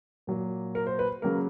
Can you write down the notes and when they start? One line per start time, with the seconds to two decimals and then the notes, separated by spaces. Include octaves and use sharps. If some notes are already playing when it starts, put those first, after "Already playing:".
0.27 A#2 F#3 A#3
0.75 A#4
0.87 C5
0.99 B4
1.22 C#3 F#3 A#3 A#4